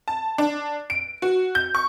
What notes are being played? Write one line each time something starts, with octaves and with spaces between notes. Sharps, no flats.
A5
D4
D7
F#4
G6
C#6